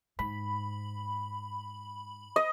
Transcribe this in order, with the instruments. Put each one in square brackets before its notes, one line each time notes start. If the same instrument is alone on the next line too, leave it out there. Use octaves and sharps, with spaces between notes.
[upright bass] G#2 [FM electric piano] B5
[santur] D#5